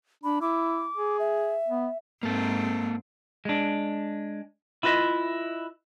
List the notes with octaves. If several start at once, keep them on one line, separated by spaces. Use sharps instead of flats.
D4 B5
E4 D6
G#4
E5
B3
G#2 A#3 C4 A4
G#3 D4
E4 F4 B4 D#5 E5